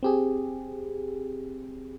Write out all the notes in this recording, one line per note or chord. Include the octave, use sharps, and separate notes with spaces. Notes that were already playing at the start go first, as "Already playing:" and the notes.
C4 G4 G#4